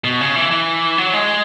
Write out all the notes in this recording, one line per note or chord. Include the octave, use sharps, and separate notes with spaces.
B2
C#3
E3
E3
F#3
G#3